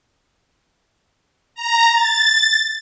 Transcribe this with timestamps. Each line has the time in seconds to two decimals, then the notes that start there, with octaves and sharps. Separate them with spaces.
1.55 A#5
1.92 A6